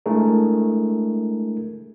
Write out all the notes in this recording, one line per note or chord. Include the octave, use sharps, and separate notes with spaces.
G#3 A3 D4 E4 G#4 A#4